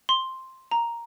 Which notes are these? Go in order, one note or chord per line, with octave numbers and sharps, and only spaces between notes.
C6
A#5